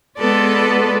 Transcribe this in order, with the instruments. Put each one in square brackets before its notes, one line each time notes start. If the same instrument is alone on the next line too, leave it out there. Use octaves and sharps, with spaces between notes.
[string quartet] G#3 B3 F4 A4 B4 D5